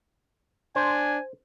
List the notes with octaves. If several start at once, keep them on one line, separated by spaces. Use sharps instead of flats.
D4 C5 G#5